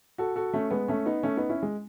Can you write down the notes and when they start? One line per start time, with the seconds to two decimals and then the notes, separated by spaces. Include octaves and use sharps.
0.18 F#4 A4
0.36 F#4 A4
0.54 A3 C#4
0.71 G#3 B3
0.88 A3 C#4
1.06 B3 D#4
1.23 A3 C#4
1.37 B3 D#4
1.49 C#4 E4
1.63 G#3